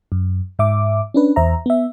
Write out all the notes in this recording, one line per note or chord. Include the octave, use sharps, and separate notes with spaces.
F#2
G#2 E5 D6
C#4 D4 B4
E2 C5 E5 A#5
B3 E5